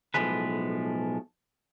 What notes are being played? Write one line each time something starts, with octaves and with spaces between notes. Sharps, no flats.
B1 F#2 A2 F3 G#3 B4